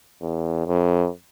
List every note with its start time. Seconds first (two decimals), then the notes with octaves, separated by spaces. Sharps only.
0.21 E2
0.67 F2